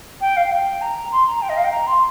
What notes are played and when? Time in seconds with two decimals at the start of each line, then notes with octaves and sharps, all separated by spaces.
0.21 G5
0.37 F5
0.51 G5
0.81 A#5
1.12 C6
1.26 A#5
1.42 G5
1.49 D#5
1.57 F5
1.65 G5
1.72 A#5
1.87 C6